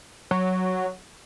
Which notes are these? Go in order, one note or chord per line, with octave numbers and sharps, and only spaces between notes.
F#3